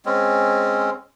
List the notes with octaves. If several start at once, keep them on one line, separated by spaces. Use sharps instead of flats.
G#3 C4 C#4